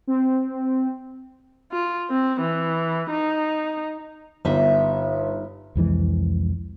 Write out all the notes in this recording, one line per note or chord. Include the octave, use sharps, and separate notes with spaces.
C4
F4
C4
E3
D#4
G1 G3 D#4 E5
C2 F2 E3 G#3